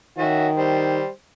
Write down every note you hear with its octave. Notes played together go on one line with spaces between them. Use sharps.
D#3 C#4 F#4 E5
G3 C5